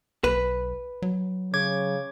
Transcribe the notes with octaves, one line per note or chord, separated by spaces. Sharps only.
B1 B4
F#3
C#3 C#5 D6 G#6